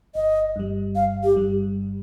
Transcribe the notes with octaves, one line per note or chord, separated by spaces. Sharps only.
G1 D#5
G2 G3
G1 F5
G4
G2 G3